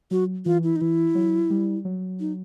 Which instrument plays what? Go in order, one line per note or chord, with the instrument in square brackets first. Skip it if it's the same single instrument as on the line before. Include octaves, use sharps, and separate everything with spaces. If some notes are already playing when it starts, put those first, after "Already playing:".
[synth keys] F#3 [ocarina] F#4
[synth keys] E3 [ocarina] F4
[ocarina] E4
D#4
[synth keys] E3 [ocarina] E4
[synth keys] F#3
G3
F#3
[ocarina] D#4